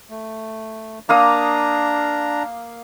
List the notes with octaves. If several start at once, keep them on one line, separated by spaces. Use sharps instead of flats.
A3
A#3 D4 F5 A#5 D#6